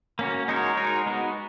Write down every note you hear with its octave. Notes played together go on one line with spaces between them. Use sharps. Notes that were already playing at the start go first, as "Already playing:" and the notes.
A#3 C#4 F#4
G#3 D#4 F#4 A#4 C#5
G#3 D#4 F#4 A#4 C#5
G#3 B3 D#4 F#4